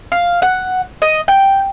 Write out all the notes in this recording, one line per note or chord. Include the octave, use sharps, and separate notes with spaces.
F5
F#5
D#5
G5